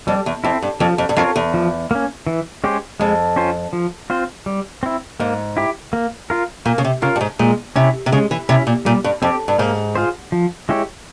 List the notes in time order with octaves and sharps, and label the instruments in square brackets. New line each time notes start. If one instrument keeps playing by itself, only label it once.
[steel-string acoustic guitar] F2 [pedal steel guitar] G3
[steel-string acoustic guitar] E2
[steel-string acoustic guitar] F2 [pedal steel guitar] C4 E4
[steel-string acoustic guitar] G2
[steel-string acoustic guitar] F2 [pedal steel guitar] F3
[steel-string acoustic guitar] F2
G2
[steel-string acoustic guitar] F2 [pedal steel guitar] C4 F4 A#4 C#5
[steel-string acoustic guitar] E2
[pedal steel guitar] F3
A#3 C#4
E3
G#3 C#4 G4 C5
[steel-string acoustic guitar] F2 [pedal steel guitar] G#3
[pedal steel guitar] C#4 F4 C5
F3
C4 F4 C5
G3
C4 E4
[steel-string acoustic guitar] G#2 [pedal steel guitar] A#3
[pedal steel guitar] E4 G4
A#3
F4 A#4
[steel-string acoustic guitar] A#2 [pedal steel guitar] A#3
[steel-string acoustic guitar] C#3
C3
[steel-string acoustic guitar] C#3 [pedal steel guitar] F4 A#4
[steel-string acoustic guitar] G2
G#2
[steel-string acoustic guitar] A#2 [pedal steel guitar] G#3
[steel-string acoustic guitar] C3 [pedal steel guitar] C#4 E4
[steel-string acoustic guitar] C3
[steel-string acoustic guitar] C#3 [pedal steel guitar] G#3
[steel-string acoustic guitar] E3
[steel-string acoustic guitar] C3 [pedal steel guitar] C#4 E4
[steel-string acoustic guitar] A#2
[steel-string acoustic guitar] A#2 [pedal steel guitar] G3
[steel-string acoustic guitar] G2
[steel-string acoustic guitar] F2 [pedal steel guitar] C4 G4
[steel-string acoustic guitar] G2
[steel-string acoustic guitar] G#2 [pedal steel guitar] A#3
[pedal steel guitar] F4 G#4 C5
F3
G#3 E4 G4 C#5